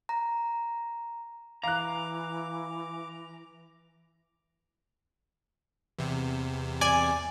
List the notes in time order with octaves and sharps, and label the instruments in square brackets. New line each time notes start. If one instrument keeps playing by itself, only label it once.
[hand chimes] A#5
[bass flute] E3 [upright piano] F5 F#6 [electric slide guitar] A#5 [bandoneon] D6
[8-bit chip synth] E2 C3
[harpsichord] D5 [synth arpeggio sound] G#5